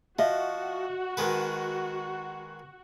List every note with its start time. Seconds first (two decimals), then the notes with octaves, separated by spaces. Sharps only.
0.19 F3 F#4 D#5 E5
1.17 D#3 G#3 B4